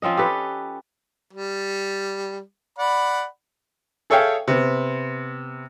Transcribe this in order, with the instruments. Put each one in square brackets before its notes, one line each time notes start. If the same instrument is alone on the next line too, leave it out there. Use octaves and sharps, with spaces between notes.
[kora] F3 C4 C#4 D#5
G4 A4 B4
[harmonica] G3
D5 F#5 B5
[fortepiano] G#4 A4 C#5 E5 F5 G5
C3 B3